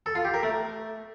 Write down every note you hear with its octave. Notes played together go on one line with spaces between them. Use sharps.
A4
F4
G4
A#4
A3